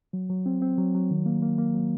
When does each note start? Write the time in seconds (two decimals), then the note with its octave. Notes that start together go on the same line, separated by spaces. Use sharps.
0.13 F#3
0.30 F#3
0.46 C4
0.62 C4
0.78 F#3
0.94 F#3
1.10 D#3
1.26 A#3
1.42 A#3
1.58 A#3
1.74 F#3